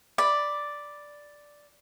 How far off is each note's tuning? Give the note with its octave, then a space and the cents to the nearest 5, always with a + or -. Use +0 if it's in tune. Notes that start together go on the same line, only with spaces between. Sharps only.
D5 +0 B5 +0